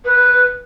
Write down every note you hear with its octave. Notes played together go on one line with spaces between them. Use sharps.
B4